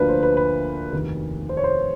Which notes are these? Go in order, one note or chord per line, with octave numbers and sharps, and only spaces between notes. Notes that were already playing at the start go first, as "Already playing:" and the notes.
Already playing: D2 D3 F3 A#3 D4 B4
C5
B4
B4
F1 D#2 D#3
C5
C#5
C5